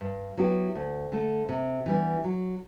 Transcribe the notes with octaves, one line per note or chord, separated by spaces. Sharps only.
G2
F#3 B3 E4 G4
D2
D3 A3
C3
E3 G3 B3 D4
F#3